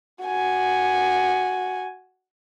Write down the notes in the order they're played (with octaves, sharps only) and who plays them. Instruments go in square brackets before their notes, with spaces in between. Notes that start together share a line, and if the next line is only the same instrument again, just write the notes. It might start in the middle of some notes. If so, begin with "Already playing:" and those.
[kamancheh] F#4 G#5